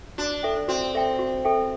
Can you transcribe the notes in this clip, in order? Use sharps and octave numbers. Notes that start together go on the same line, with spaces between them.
D4 F#4
A4 E5 G5
C4 F#4
A4 E5 G5
F#4
A4 E5 G5